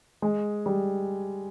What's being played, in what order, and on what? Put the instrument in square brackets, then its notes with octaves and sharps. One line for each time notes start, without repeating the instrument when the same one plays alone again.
[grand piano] G#3
G3